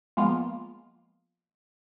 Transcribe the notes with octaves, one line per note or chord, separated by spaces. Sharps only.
F3 G#3 A#3 B3 F4